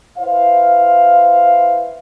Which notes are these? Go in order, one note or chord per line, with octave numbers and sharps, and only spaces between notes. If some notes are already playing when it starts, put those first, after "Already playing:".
E4 B4 C5 F5